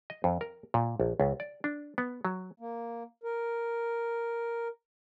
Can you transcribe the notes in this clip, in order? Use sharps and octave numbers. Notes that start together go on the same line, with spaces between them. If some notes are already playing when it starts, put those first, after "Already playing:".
D#5
F2
A#4
A#2
A#1
C#2
D5
D4
B3
F#3
A#3
A#4